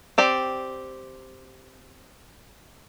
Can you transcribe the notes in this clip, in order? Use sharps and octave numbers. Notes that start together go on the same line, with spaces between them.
C4 G4 D5